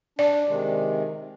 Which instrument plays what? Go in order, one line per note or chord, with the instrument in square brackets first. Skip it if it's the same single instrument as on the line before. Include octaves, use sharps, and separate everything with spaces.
[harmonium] D4 [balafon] D5
[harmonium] C3 D#3 G#3